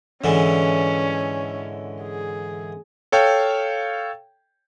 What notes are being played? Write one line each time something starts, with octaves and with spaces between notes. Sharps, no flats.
G#2 D3 E3 C#4
G#4
A4 C#5 F5 G5